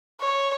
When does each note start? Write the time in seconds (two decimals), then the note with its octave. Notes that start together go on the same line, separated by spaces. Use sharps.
0.21 C#5